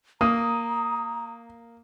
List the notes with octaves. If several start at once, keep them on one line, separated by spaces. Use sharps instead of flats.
A#3 A#5 D#6